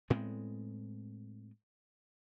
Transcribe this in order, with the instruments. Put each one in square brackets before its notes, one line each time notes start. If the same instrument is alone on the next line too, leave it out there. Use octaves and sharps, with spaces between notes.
[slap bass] A2 G#3 B3 C4